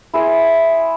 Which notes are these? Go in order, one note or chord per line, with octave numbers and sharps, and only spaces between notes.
E4 G#4 C5